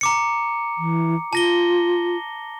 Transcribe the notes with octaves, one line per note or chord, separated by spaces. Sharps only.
A#5 D6 C#7
E3
F4 A5 A#6 G7